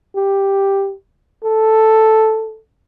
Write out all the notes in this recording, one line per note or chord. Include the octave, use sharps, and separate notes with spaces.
G4
A4